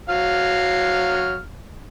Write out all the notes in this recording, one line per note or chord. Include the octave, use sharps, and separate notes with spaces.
F#3 F5 F6